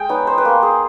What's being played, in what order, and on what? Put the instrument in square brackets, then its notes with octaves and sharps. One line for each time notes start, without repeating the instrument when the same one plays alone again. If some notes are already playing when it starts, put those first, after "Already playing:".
Already playing: [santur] G#3 G5
B3 D#4 C#5
C5
B4
A#3 C5
G#4